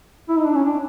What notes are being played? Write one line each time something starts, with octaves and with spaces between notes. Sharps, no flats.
E4
D#4
D4
C#4
D4